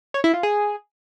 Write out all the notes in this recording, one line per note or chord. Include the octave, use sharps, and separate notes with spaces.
C#5
E4
F4
G#4